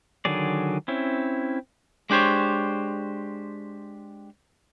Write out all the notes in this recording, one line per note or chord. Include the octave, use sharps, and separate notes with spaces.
D3 D#3 F#3 G#4 D5
C4 C#4 E4
G#3 D4 G4 C5 C#5